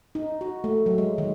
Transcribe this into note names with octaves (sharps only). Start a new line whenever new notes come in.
D#4
F#4
A3
F#3
G#3
D#3